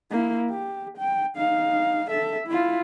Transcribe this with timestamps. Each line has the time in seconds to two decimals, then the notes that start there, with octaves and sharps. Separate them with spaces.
0.10 A#3 E4
0.50 G4
0.98 G5
1.36 D#4 F5
2.10 A4 E5
2.47 E4 F4